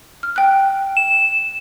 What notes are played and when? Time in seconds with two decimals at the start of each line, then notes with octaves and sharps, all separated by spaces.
0.23 F6
0.36 G5 F#6
0.97 E7